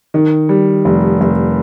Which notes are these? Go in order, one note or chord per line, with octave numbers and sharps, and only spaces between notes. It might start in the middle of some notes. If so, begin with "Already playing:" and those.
D#3
G3
F1
F1